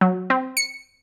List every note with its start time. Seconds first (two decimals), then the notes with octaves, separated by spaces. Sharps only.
0.01 F#3
0.30 C4
0.57 C#7